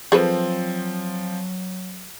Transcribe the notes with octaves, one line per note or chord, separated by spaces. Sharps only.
F3 F#3 C4 G#4 A4 B4